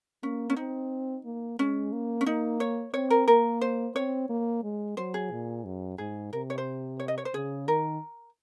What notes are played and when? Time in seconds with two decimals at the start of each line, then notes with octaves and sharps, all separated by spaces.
0.23 A#3 C#4
0.50 C#4
0.56 C4 D#4
1.25 A#3
1.59 G#3 C#4
1.92 A#3
2.21 C#4
2.26 A#3 D#4
2.60 C#5
2.94 C4 C#5
3.10 A#4
3.28 A#3 A#4
3.61 C5
3.95 C4 C#5
4.29 A#3
4.63 G#3
4.97 F#3 C5
5.14 G#4
5.31 A#2
5.65 F#2
5.98 G#2 G#4
6.33 C3 A#4
6.50 C#5
6.58 C5
7.00 C#5
7.08 D#5
7.18 C#5
7.25 C5
7.34 C#3 G#4
7.68 D#3 A#4